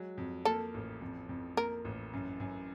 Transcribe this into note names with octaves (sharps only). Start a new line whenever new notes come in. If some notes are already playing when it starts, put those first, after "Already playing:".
Already playing: F#3 G#3
F2
A#3 A4
A1
F2
F2
A#3 A#4
A1
F#2
F#2